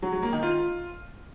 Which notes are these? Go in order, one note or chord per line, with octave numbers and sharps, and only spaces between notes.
F#3
F#3
A#3
D#3
F4